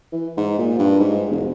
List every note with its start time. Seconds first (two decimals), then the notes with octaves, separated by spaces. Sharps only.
0.12 E3
0.37 G#2
0.59 A#2
0.79 G2
0.99 G#2
1.31 E1